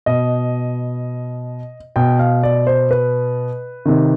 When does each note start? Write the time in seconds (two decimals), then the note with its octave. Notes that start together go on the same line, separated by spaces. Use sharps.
0.06 B2 D#5
1.96 B2 G5
2.19 F5
2.43 D5
2.67 C5
2.91 B4
3.85 C3 D#3